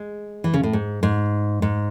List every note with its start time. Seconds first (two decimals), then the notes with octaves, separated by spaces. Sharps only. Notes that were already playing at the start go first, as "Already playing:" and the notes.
Already playing: G#3
0.44 E3
0.54 C#3
0.63 A2
0.73 G#2
1.03 G#2
1.62 G#2